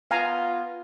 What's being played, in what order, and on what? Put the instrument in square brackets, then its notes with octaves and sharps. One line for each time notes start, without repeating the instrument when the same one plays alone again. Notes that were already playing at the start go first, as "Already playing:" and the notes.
[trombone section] B3 F4 [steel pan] F5 G#5 A#5